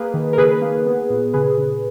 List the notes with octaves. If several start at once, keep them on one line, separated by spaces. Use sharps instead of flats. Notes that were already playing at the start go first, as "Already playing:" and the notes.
Already playing: A#3 G#4 B4
D#3
A#4
C#3 G#4 B4
A#3
B3
A#2
C#3 G#4 B4
C#3